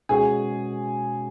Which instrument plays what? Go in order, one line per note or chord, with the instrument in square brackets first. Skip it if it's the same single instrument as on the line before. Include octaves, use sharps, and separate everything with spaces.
[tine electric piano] B2 G#3 C#4 F#4 [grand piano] G#4